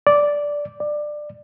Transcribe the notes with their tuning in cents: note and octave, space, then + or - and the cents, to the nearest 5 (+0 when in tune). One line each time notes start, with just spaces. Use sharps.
D5 -5
D5 +20